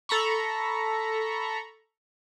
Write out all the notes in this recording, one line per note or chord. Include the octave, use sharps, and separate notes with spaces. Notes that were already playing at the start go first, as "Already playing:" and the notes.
A4 A#5 B5 C#6